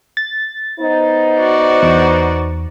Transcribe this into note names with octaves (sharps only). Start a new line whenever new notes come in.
A6
B3 D#4 C5
F#4 D5
E2